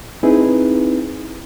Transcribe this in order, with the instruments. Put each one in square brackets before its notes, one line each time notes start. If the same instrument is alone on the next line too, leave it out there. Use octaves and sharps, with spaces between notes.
[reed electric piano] C4 D#4 E4 G#4 B4